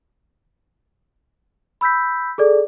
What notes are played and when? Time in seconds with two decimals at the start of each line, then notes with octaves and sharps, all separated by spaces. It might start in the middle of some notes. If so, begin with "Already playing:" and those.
1.81 B5 E6 G6 B6
2.38 G#4 A4 D5